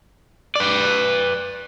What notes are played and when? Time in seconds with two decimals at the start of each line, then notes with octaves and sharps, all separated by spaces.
0.56 B4 D5